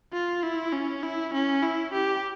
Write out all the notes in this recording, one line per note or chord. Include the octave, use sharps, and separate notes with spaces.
F4
E4
C#4
E4
C#4
E4
G4